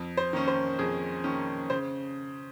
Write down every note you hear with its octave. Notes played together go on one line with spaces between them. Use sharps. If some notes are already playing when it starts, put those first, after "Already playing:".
Already playing: F2
C5
D#3 A#3 C#4
C5
F2 G#4
D#3 A#3 C#4
C#3 C5